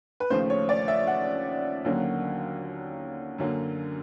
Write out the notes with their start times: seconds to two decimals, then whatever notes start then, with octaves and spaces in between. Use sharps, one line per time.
0.20 B4
0.30 D#2 C#3 F3 A3 C5
0.50 C#5
0.69 D5
0.88 E5
1.07 F#5
1.85 D#2 D3 F#3 A#3 C#4
3.38 F#2 D3 F#3 A#3 C#4